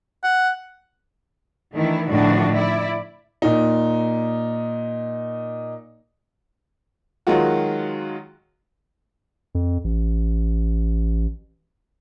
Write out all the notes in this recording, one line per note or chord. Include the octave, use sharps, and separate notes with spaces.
F#5
D#3 E3 A3 D4 E4
A2 D3 D#3 F3 D4 F#4
E4 D5
A#2 D#4
D#3 F#3 G#3 F4 F#4
F2
A1